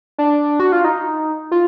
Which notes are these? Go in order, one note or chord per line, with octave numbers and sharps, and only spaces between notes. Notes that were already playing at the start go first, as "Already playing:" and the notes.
D4
F#4
F4
D#4
F4